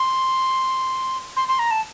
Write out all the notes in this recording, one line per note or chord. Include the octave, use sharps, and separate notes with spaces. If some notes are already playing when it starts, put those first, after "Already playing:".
Already playing: C6
C6
C6
A#5
A5